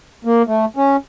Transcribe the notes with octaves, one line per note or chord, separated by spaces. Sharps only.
A#3
A3
C#4